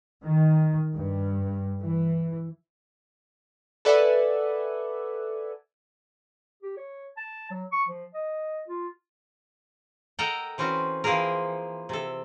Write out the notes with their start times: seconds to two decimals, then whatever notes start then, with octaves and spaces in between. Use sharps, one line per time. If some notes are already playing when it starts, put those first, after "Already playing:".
0.25 D#3
0.95 G2
1.82 E3
3.85 A4 B4 D5 E5 F#5 G#5
6.63 G4
6.77 C#5
7.17 A5
7.51 F#3
7.72 C#6
7.88 F3
8.14 D#5
8.68 F4
10.19 A4 A#4 D#5 F#5 G5 A#5
10.58 E3 C4 C#4 F#4
11.04 E3 F3 A#3 C4 G#4 A#4
11.89 C3 A4